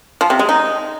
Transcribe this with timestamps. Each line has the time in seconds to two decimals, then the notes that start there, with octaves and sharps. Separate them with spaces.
0.21 F3
0.30 C3
0.39 G#3
0.49 D#4